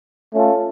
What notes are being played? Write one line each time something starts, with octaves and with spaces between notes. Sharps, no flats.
A3 C#4 F4 A4